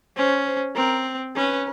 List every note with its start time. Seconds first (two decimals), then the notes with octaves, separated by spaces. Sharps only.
0.17 C#4 C5
0.46 C5
0.76 C4 A#4
1.36 C#4 B4